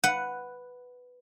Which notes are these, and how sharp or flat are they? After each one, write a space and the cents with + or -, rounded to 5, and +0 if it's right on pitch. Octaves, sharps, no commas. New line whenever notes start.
B4 +5 F#5 +0